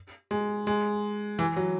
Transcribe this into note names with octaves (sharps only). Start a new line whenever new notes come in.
G#3
G#3
E3
F#3